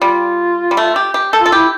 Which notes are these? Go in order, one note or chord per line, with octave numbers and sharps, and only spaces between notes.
G3 F4
G3
A3
G4
G4
A4
F4
A4
E4 G4